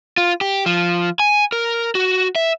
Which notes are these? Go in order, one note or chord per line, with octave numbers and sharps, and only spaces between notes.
F4
G4
F3
G#5
A#4
F#4
E5